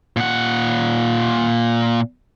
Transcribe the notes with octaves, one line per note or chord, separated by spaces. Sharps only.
A#2 F#5